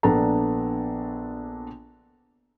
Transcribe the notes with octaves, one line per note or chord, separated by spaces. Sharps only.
A#1 B3 D4 A4 A5 A#5